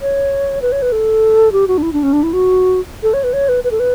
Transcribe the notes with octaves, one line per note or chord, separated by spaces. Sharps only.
C#5
B4
C#5
B4
A4
G4
F#4
D4
E4
D4
C#4
D4
E4
F#4
A4
C#5
B4
C#5
B4
B4
A4
B4